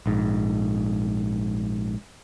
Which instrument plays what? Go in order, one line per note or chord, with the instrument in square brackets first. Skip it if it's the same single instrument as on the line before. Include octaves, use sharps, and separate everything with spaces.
[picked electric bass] A#1 G#2